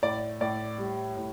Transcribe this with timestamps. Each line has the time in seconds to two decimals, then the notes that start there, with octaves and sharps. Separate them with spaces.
0.02 A2 D5
0.40 A2 D5
0.78 G3
1.17 A2